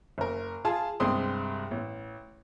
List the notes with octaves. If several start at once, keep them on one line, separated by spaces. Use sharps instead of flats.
F#1 A#4
F4 G#4 A5
C2 G2 G#3 C4 C6 D#6
A1